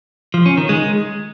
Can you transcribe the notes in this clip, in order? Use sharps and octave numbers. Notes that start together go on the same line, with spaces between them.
F3
C#4
D#3
G#3